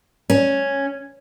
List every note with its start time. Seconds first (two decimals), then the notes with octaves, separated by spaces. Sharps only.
0.30 C#4